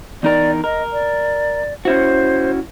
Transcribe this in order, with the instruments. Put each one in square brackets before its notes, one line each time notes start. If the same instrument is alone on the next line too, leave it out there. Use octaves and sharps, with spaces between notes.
[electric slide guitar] E2 D#4 A#4 [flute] D5
[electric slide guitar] A#4 [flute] D#5
[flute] D5
[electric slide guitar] C#4 E4 F#4 [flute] C5